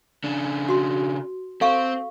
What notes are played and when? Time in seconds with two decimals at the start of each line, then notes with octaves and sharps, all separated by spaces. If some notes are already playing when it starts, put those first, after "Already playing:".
0.24 C#3 D4
0.69 F#4 C6
1.61 C4 A4 F5 C#6